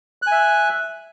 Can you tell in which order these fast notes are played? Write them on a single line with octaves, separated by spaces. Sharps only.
F#6 G#5 E5